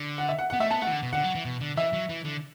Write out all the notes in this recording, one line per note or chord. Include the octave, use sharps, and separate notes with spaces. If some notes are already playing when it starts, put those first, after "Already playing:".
Already playing: D3
F#5
E5
F#5
F#5
B3
A3 E5
B3 A5
A3 F#5
E3
D3
B2
D3 F#5
F#3
E3
B2
D3
E3 E5
F#3
E3
D3